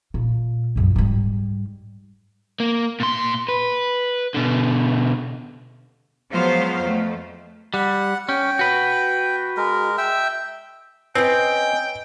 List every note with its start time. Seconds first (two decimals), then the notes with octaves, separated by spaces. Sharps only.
0.14 A#2
0.76 C2 F#2
0.96 G#2 G3
2.60 A#3
3.00 A#2 C6
3.49 B4
4.34 B2 D3
6.30 F3 F#3 G#3 B3 C5 F5
6.79 F2 A3
7.74 G3 F#5
8.29 C#4 G5
8.59 F#4 B4
9.57 G#3 A#4
9.98 E5 G5 E6
11.15 C4 C#4 B4 D#5 G5